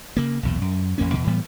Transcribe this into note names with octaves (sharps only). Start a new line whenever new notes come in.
C#3 A#3
B1 E2 A#2
F#2
A1 F2 A#3 C#4
E2 B2
A2 E3 G3 B3